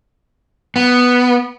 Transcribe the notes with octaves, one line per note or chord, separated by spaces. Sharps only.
B3